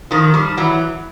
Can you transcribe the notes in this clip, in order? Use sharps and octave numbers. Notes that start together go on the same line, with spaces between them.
D#3 F3
F3 G3
E3 F#3